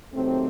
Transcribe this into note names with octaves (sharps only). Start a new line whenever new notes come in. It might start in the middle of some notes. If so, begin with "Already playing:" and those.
C3 D#3 F#3 A3 C4